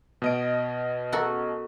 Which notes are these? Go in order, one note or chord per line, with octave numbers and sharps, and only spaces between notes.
B2 D#5 D7
F#4 A4 A#4